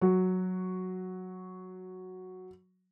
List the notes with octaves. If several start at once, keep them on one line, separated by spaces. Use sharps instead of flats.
F#3 F#4